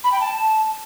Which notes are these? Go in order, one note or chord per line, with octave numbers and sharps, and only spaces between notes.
B5
G5
A5